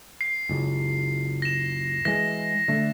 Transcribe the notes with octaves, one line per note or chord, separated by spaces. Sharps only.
C7
F#1 C#2
A#6 E7
E3 G#3 A#6
D3 A3